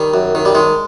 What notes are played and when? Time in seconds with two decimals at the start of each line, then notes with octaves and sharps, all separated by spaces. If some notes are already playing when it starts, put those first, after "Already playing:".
Already playing: D#3 G3
0.14 F#2
0.35 D#3
0.45 G3
0.55 D#3 G#3